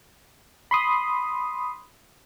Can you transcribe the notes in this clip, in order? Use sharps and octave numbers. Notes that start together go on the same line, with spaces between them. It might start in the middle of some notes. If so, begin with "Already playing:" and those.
B5 C6 D#6